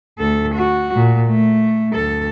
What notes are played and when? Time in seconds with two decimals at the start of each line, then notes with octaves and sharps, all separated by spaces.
0.19 D2 A4
0.54 F#4
0.95 A#2
1.27 A3
1.94 D2 A4